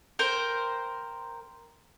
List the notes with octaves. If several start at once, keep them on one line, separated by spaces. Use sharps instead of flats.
A#4 C5 G5